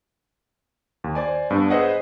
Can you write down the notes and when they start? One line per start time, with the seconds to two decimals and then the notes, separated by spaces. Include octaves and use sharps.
1.04 D#2
1.15 C5 D5 G#5
1.50 G2 B3 D4
1.70 G#4 B4 C5 D#5 F#5